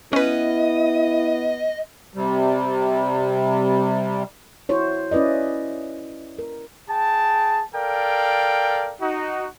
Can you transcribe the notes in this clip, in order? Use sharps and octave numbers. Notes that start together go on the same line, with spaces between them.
B3 C#4 E4 B4 D#5
C3 G3
E4 F#4 C5 C#5
C#4 E4 B4 D5 D#5
A#4
G#4 G5 A5
A4 A#4 D5 F5 G5
D#4 F#4